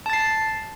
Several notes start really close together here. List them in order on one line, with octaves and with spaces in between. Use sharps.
A5 A6 C7